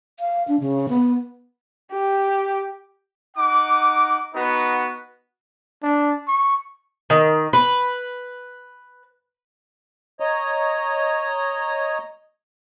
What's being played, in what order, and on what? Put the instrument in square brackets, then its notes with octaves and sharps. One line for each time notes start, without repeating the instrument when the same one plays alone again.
[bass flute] F5
D4
C#3
B3
[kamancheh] G4
[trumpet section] D#4 F#5 D6
B3 D#4 F#4 B4
[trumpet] D4
C#6
[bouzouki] D#3
B4
[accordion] C#5 D#5 A#5